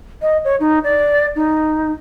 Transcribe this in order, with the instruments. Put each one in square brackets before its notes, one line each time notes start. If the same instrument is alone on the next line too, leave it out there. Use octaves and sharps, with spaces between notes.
[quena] D#5
C#5
D#4
D5
D#4